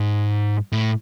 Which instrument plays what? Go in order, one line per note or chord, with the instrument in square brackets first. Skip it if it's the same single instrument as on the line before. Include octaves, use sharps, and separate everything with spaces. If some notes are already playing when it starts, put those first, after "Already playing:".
Already playing: [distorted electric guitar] G#2
A2